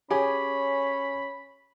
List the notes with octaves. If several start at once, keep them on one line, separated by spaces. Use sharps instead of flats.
C#4 G4 G#4 C#5 G#5 B5